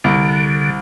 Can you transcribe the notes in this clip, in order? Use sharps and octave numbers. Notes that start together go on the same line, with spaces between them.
C2 D3